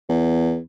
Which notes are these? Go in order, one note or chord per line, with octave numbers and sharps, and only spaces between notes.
E2